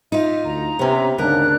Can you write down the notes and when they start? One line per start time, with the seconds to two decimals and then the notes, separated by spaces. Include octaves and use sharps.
0.12 D#4 F4 E5
0.45 D2 A#5
0.79 C3 B3 C#4
1.18 D2 G#2 C#3 D4 A#4 F#6